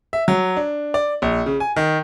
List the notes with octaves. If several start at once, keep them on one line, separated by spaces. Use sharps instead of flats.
E5
F#3
D4
D5
A#1
C#3
G#5
D#3